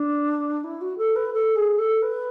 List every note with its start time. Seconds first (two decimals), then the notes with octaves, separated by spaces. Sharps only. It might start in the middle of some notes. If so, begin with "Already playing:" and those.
Already playing: D4
0.63 E4
0.81 F#4
0.97 A4
1.15 B4
1.33 A4
1.55 G#4
1.78 A4
2.02 B4